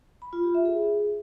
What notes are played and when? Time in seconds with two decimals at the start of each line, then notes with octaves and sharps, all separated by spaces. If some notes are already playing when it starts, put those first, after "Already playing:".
0.22 B5
0.33 F4
0.44 G4
0.55 E5
0.65 G#4